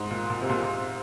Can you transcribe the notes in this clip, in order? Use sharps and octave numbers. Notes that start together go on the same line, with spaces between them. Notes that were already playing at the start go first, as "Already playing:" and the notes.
Already playing: G#2
A#2
A#2
C3
A#2
A#2